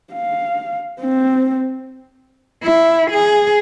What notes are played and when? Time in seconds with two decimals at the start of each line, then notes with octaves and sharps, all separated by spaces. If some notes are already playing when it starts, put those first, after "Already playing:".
0.13 F5
1.00 C4
2.63 E4
3.11 G#4